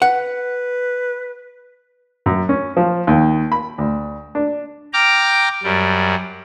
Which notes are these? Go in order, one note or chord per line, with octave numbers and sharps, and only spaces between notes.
B4 F#5
F#2
C#4
F3
D#2
B5
D2
D4
G5 A#5 D6 F6
F#2 G3